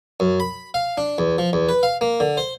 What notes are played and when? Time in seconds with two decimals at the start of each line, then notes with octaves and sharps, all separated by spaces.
0.20 F#2
0.40 B5
0.74 F5
0.98 D4
1.18 E2
1.38 F3
1.53 E2
1.69 B4
1.83 F5
2.01 A#3
2.20 D3
2.37 C5